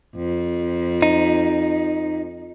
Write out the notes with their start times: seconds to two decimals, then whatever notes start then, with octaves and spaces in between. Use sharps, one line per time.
0.16 F2
1.02 D#4